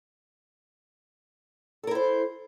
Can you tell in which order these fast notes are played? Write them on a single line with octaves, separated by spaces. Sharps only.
A4 A#4 E4 C5